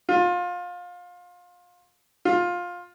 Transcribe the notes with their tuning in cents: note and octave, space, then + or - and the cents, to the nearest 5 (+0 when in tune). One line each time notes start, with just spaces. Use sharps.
F4 +25
F4 +15